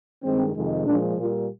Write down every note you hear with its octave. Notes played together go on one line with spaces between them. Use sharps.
G2 D#3 G#3 C4
F2 C3 D#3 G#3
A#2 F3 G#3 D4
A#2 G3 A#3 F4